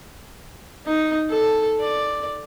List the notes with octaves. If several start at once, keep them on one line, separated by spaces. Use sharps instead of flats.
D#4
A4
D5